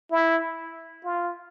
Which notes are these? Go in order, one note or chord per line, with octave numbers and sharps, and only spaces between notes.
E4
F4